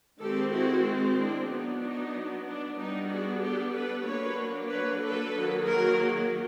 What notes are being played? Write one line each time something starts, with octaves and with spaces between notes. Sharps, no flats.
D#3 G#3 C4 G4 A4
E4 F#4
D4 E4
F#3 B3 D4 D#4
D#4
D4
G3 B3 D4 D#4
F#4 G#4
G4 A4
A4 B4
F#3 A#3 D4 B4 C#5
B4 C#5
A4 B4
D#3 F#3 A#3
G#4 A#4